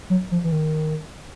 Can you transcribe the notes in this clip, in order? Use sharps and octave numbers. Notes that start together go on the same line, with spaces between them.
F#3
F3
E3
D#3